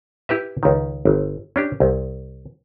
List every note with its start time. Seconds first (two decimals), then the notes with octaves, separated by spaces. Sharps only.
0.29 E4 G4 B4 E5
0.63 C#2 D#3
1.05 G1
1.56 C#4 D4 G4
1.80 C2